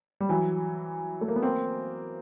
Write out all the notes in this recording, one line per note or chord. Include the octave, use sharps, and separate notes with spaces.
G3
E3 F#3
A3
A#3
B3
A#3 C4